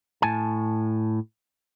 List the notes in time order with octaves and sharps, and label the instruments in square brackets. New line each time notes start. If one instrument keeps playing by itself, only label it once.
[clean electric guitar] A2 G#5 A5